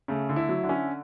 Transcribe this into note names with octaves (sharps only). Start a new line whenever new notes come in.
C#3 A3
D3
E4
F#3
D3
C#4